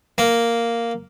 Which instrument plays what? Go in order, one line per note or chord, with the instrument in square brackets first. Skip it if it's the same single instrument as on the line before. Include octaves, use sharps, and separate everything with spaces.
[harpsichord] A#3